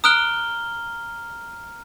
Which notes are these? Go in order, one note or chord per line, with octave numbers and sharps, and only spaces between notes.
A#5 D#6 F6 F#6 D7 G7